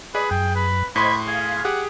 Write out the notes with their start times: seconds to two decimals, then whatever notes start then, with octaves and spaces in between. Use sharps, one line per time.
0.15 G#4 B4 D5 D#5
0.31 F#2 G5
0.55 B4
0.96 A2 C5 D#5 B5 C6 G#6
1.27 G#4 F5
1.65 G4 G#4 F#5